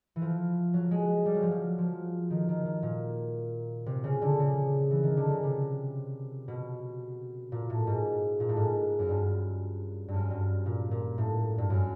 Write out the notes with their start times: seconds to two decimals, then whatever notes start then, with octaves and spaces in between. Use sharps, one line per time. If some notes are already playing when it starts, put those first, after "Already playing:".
0.16 E3
0.22 F3
0.74 F#3
0.91 G#3
1.26 G3
1.34 F#3
1.42 F3
1.51 F#3
1.78 F3
2.30 D#3
2.48 D#3
2.65 D#3
2.82 A#2
3.86 C3
4.04 C#3
4.22 D3
4.39 C#3
4.91 E3
5.03 D#3
5.17 D3
5.30 C#3
5.43 C3
6.48 B2
7.52 A#2
7.70 A2
7.87 G#2
8.40 A#2
8.49 A2
8.57 G#2
8.99 F#2
9.09 G2
10.08 G2
10.14 F#2
10.31 G2
10.66 A#2
10.91 A#2
11.18 A2
11.58 G2
11.70 F#2